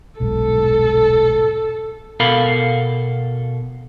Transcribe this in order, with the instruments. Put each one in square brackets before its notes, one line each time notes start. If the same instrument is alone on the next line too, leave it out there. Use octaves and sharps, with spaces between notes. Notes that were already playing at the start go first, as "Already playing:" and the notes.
[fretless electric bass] D#1 B1 G#2 [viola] A4
[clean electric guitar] B2 A4 A#4 F5 B5